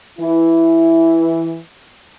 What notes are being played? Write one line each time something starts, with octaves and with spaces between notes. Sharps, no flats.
E3 E4